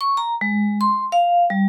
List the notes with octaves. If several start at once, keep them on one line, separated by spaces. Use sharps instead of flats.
C#6
A#5
G#3
C6
F5
G3